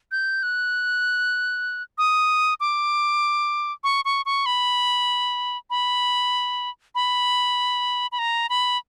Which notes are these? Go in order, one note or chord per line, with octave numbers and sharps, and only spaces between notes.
G6
F#6
D#6
D6
C#6
C#6
C#6
B5
B5
B5
B5
A#5
B5